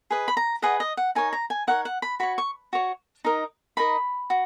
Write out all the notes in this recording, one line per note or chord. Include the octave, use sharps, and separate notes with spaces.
G#4 B4 D#5
B5
A#5
G#4 B4 D#5 F#5
D#5
F#5
D#4 A#4 C#5 G#5
A#5
G#5
D#4 A#4 C#5 F#5
F#5
B5
F#4 C#5 B5
C#6
F#4 C#5
D#4 A#4 D#5
D#4 A#4 D#5 B5
F#4